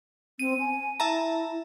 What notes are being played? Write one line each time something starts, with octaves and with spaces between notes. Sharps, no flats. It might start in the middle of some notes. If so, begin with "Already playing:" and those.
C4 D#7
G#5
E4 E5 A5 A#5